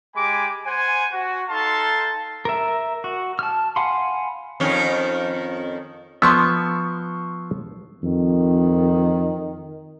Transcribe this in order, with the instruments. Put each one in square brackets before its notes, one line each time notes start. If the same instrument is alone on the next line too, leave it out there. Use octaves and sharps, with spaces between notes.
[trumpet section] G#3 G4 G#5 B5 D6
C5 F#5 G#5
F#4
D#4 A4 F5 A5 C6
[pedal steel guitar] A#4 E5
F#4
A5 F6
F5 F#5 G#5 B5 C6
[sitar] F2 D#3 C#4
[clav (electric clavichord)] F3 B3 [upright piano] C6 C#6 E6
[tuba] F2 [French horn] D#3